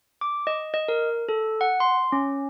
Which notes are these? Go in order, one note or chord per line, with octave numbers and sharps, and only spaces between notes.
D6
D#5
D#5
A#4
A4
F#5
C6
C#4